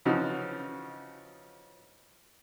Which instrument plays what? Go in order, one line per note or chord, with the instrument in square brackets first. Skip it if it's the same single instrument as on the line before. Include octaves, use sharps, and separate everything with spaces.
[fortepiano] C#3 E3 F3 D#4 F#4